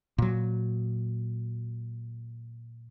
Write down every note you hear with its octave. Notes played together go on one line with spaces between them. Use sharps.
A#2 F#3